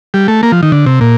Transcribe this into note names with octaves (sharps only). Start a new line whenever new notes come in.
G3
A3
A#3
F3
D#3
D3
C3
A#2